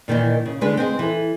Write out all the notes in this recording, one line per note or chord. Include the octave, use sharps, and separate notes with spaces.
A#2 D#3 E3 D#4
C#3
D3 G#3 D4 B4
C4 D#4 G#4 C5
E3 A4